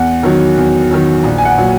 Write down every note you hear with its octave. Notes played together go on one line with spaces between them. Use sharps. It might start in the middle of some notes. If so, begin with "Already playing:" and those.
Already playing: E2 F#5
D#3 F#3
E2
D#3 F#3
A#1
G#5
F#5
A#2 F#3